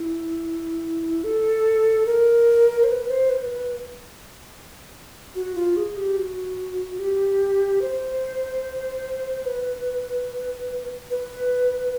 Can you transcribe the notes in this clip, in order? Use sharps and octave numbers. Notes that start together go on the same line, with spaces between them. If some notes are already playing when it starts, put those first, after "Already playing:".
Already playing: E4
A4
A#4
C5
B4
C5
B4
B4
F#4
F4
G#4
G4
F#4
G4
C5
B4
B4